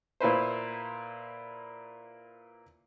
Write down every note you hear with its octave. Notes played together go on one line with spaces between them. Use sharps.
A#2 E4 B4 C5